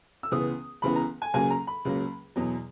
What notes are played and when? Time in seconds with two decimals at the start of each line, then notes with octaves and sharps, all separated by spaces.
0.23 E6
0.31 C#2 C#3 E3 B3 D#6
0.82 C#2 C#3 E3 B3 B5
0.96 A#5
1.22 G#5
1.34 C#2 C#3 F#3 A#3 G#5
1.50 A#5
1.67 B5
1.85 C#2 C#3 F#3 A#3
2.36 E2 B2 F#3